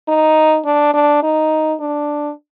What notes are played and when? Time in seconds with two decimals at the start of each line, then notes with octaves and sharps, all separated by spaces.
0.08 D#4
0.65 D4
0.94 D4
1.23 D#4
1.80 D4